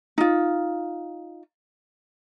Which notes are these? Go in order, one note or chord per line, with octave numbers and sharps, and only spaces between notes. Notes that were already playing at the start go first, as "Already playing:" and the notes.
D#4 F4